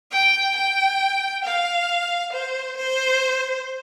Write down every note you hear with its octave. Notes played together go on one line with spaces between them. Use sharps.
G5
G5
F5
C5
C5